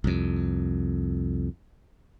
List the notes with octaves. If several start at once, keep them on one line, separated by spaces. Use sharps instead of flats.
C2 F2